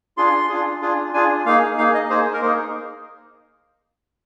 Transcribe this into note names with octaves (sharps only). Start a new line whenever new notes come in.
D4 F4 G#4 C6
D4 F4 G#4
D4 F4 G#4
D4 F4 G#4 G#5
A#3 D#4 G#4 F5
A#3 D#4 G#4 F5
D#5
A#3 D#4 G#4 C5
A#4
A#3 D#4 G#4 C5